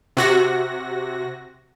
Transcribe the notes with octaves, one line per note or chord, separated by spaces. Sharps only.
C3 F#4 A#6